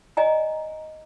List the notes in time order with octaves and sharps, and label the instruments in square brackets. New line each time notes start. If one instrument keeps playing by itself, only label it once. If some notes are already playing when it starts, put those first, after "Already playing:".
[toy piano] D5 D#5 G#5 A#5